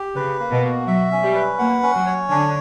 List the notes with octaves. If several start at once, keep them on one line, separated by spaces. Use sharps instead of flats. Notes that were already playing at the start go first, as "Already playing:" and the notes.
Already playing: G4
C#3 B4
A#3
B2
F#4
F#3 E5
C#4
G3
B4
A#3 F#5
C#4
F#3
C#5
D3 D4